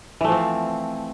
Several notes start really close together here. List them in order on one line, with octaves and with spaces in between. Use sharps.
E3 A3 F3 C4